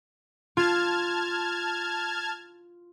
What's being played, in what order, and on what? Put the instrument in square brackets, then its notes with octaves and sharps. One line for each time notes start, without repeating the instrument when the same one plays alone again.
[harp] F4 [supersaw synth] A5 F6 G#6